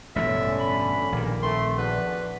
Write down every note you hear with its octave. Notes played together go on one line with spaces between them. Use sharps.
A1 G2 B2 D3 C#4 E5
B5
A#1 G2 D#3 A#3
A3 C4 C6
E2 D4 F#4 B4